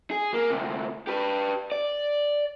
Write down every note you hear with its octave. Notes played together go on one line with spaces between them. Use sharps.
G#4
A#3
D2 C3
G4 B4
D5